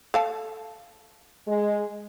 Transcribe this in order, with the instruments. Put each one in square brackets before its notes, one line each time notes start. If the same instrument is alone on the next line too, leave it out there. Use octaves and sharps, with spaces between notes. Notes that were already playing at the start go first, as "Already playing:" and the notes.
[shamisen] A4 F5 A5
[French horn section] G#3